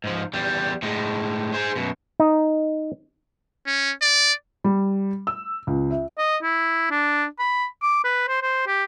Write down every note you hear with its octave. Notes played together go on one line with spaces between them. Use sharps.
G#2 F3
E2 G3
A2 G#3
G#4 C5
F#2 B2
D#4
C#4
D5
G3
E6
C#2
E5
D#5
E4
D4
B5
D6
B4
C5
C5
G4